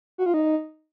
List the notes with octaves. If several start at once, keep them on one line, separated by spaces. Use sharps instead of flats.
F#4
F4
D#4